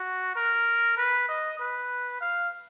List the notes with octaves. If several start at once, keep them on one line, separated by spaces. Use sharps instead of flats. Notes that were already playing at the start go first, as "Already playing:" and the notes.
Already playing: F#4
A#4
B4
D#5
B4
F5